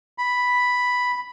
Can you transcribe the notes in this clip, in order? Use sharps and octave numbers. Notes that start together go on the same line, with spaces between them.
B5